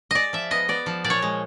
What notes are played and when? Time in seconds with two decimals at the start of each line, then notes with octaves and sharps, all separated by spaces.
0.11 G#3 D5 D#5
0.33 F3 E5
0.51 B3 D#5
0.68 B3 D5
0.86 F3
1.04 A#2 D5
1.10 C#5
1.22 G#3